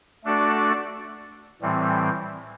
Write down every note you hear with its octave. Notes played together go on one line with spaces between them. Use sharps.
A3 D4 F#4 A4 D5
A2 E3 G3 C4